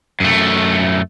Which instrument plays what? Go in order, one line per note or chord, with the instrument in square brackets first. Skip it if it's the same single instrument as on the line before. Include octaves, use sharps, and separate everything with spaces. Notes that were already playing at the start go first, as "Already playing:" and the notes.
[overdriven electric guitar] F#2 A3